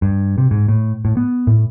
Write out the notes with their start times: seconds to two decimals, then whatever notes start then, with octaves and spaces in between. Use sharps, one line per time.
0.02 G2
0.38 C3
0.51 G#2
0.68 A2
1.05 A2
1.17 B3
1.47 A2